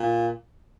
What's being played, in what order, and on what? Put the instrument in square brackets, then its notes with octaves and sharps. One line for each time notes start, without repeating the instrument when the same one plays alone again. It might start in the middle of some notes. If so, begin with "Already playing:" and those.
Already playing: [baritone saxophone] A#2